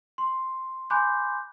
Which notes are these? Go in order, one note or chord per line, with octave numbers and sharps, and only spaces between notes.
C6
G#5 B5 C6 D6 F#6 G6